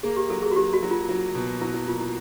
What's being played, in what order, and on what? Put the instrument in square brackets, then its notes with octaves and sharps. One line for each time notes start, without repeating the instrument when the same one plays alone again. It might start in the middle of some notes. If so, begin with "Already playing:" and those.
[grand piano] A#3 [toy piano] G#4
[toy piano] G4
[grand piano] F#3 [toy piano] A4
[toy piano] G#4
F#4
[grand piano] F#3 [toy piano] G4
[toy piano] F#4
[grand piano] F#3
[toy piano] F4
[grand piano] F#3
B2
[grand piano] F#3 [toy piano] E4
[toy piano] E4
[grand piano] A#3 [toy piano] F4
[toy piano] E4